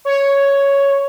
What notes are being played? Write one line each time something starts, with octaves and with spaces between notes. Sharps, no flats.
C#5